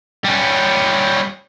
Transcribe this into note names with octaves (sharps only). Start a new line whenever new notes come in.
G3 C#4